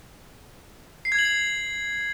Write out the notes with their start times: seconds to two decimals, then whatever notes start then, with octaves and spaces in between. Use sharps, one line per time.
1.05 C7
1.12 G#6
1.19 F#7
1.25 C7